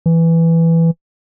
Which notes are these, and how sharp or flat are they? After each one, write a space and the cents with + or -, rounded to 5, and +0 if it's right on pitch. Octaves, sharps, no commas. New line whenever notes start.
E3 +5